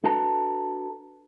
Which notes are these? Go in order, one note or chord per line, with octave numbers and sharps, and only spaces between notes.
D4 F#4 A4 B4 A5 A#5